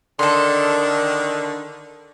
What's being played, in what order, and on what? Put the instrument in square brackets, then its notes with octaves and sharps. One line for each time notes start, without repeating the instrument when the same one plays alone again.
[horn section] D3 D#3 [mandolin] A4 C6